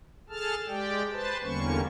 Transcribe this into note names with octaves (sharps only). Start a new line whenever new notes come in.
G#4 A4 A5 F6
G#3 G4 D5 G5
B4 C5 A5
E2 D3 G3 A#3 C#4 C#6